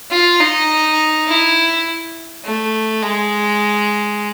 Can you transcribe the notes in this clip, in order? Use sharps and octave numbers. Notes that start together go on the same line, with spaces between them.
F4
D#4
E4
A3
G#3